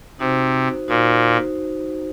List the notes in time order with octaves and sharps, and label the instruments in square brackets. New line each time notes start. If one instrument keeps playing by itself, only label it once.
[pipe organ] C3 [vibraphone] D#4 F#4 C5
[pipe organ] A#2 [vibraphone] D#4 F#4 C5